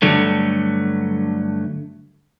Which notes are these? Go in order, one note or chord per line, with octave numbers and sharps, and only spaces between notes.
G2 D3 F#3 A3